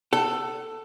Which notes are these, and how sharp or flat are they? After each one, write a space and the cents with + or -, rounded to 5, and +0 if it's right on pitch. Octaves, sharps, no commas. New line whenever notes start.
A4 +10 F#5 +35